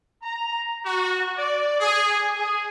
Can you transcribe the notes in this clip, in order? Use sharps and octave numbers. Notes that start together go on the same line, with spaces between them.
A#5
F#4
D5
G#4
G#4